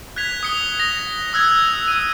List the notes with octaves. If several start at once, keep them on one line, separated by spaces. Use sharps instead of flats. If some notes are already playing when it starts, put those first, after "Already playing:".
F#6 G#6 B6 F7
D#6 C#7 G7
A#6 F7
D#6 E6 F#6 G#6
E6 D#7